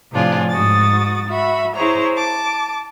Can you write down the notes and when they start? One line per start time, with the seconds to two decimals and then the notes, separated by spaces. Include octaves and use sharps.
0.11 A2 C3 F3 D4 F4 G#4
0.49 G#2 F#4 D#6 A6
1.27 F#4 E5 B5
1.75 E4 G#4 C5 C#5 A#5
2.16 A5 D6